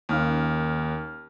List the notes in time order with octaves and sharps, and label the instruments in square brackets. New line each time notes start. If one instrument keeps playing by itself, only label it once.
[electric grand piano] D#2 F6 [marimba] C#4 D#4 F5